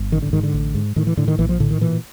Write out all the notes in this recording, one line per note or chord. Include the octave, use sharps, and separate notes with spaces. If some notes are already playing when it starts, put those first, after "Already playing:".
Already playing: G1
A1 D#3
D3
G#2 D#3
D3
A1
G#2
A2 D#3
E3
A2 D3
D#3
A#1 E3
F3
A2 D3
D#3
A#2 E3